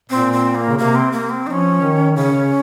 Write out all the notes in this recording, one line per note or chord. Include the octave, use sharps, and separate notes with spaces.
A#2 C4
C4
A#3
C#3
C3 A#3
C4
A#3
C4
F3 C#4 D#4
D#3
C#3 C#4
C#3